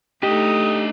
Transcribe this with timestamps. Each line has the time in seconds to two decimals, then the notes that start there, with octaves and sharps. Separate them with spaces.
0.23 A3 D4 D#4 G4 A4 D#5 D#6